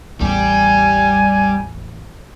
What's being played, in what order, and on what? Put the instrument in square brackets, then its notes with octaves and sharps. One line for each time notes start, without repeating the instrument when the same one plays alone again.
[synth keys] A1 E2 [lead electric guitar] G3 G4 [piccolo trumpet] G#5